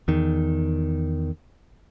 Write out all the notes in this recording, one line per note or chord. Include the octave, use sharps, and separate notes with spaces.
E2 D#3